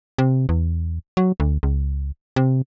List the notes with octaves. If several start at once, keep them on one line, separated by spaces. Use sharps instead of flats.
C3
E2
F#3
D2
C#2
C3